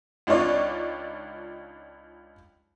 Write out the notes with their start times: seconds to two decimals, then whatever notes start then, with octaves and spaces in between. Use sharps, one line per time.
0.27 C#2 D4 D#4 F4 C#5 D5